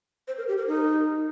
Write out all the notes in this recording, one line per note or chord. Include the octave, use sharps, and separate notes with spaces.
C5
A#4
G4
A#4
D#4